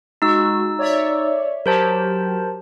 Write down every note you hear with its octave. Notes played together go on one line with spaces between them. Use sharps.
G#3 D#4 F#4 E6
C#5 D5 E5
F#3 G4 A#4 C5 A5